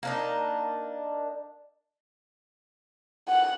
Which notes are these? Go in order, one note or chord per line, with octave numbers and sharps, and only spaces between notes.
A#3 D4 D#4
F#5